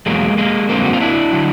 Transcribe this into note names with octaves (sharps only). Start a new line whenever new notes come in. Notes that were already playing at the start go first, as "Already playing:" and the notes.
E2 B2 F#3 G#3 A#3
G#3 A#3
F2 D3 F#3 A#3 C4
F#4
F4
D4 E4
D3 F#3